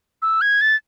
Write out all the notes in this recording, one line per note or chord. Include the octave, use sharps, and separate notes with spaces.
E6
G#6
A6